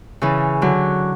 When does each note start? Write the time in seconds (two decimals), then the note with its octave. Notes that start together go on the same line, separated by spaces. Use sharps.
0.22 C#3 E3
0.62 D3 F#3